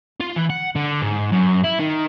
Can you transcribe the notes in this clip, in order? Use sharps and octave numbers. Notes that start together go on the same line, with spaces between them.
F4
E3
F#5
D3
G#2
F#2
E4
D#3